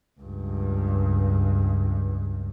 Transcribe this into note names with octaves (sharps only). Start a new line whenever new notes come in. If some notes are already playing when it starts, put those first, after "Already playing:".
C#2 G2